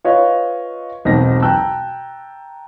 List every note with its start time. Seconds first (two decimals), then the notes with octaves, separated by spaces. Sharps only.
0.04 F4 B4 C#5 D#5 F5
1.05 E1 B1 C4 D#4 F#4 A#6
1.42 G5 A5 A#5 E6 F#6